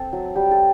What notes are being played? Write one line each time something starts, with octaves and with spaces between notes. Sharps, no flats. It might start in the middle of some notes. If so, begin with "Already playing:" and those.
Already playing: C4 A4
F#3
G3 G4
A4